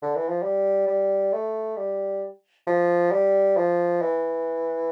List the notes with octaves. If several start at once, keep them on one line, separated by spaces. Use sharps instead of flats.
D3
E3
F3
G3
G3
A3
G3
F3
G3
F3
E3